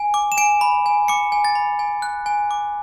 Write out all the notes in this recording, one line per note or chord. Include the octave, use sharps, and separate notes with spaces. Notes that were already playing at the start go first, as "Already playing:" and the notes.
Already playing: G#5
D6
E7
G#5 D7
B5
G#5
D6 C#7
G#5
A6
B5
G#5
F#6
G#5
D6